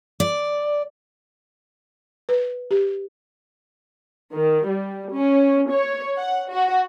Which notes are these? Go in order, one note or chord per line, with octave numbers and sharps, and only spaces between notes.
D5
B4
G4
D#3
G3
C#4
C#5
F#5
F#4